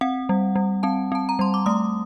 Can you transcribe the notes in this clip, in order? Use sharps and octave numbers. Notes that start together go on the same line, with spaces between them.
C4 F#5
G3
G3
C4 A5
C4 A5
A#5
G3 C6
D6
A3 D#6